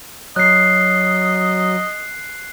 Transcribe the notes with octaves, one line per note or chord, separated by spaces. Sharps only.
F#3 D#5 F#6 C7